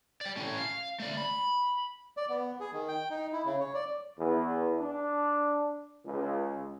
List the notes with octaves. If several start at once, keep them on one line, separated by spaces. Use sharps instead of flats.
D5 G5
A2 C#4
F5
A3 D5
B5
D5
B3
G#4
D#3
G5
D#4
E4
C#3
C#5
D5
E2
D4
C#2